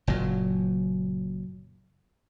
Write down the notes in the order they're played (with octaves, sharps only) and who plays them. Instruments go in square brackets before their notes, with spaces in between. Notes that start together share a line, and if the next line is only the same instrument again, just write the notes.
[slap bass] F#1 A#2 F#3